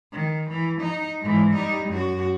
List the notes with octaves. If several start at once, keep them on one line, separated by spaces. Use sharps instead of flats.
D#3
E3
D#4
G#2 E3
G3 D#4
F#2 F#4